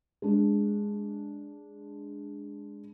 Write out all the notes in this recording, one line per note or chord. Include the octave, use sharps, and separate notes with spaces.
G#3 D4